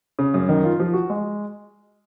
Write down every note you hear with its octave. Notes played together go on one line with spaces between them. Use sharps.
C#3
F#2
D#3
F4
F3
F#4
G#3